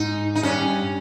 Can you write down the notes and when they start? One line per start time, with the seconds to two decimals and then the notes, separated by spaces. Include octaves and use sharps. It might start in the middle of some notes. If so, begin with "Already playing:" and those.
Already playing: G#2 D#4
0.35 D#4
0.43 G2 C#4